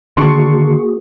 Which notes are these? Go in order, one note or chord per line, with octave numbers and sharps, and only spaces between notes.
D3 D#3 A#3 D4 F#4 G#4 C6 C#6